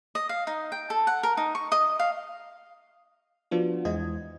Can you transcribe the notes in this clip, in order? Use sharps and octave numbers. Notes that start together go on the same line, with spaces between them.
D#5
F5
D#4
G5
A4
F#5
A#4
D#4
C#6
D#5
F5
F3 B3 D4 F4 F#4
E2 G#3 E4 C5 D#5 G#6